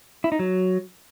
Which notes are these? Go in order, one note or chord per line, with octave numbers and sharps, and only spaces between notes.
E4
D#4
F#3